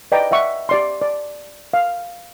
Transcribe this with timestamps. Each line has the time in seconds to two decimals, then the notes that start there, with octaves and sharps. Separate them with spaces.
0.12 B4 D5 D#5 G5 A#5
0.31 D5 E5 F#5 C#6
0.69 G4 D5 C6
1.02 D5
1.74 F5